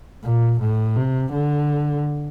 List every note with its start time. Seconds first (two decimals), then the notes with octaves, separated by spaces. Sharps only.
0.24 A#2
0.61 A2
0.96 C3
1.32 D3